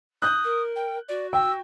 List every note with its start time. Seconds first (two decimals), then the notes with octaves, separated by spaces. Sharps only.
0.22 D#6 F#6 G6
0.44 A#4
0.76 G5
1.09 F#4 D5
1.33 G5 E6